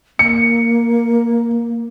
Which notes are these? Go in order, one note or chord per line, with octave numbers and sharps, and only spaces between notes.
A#3 C#7